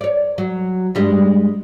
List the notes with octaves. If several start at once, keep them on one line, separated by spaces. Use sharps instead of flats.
C#5 D5
F#3
G2 G3 G#3